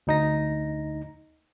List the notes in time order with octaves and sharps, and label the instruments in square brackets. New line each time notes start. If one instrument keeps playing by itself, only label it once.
[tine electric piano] D2 D#4 A#6